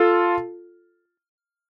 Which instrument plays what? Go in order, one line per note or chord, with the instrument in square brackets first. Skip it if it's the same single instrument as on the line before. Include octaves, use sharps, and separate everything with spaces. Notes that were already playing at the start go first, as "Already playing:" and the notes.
Already playing: [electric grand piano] F4 A4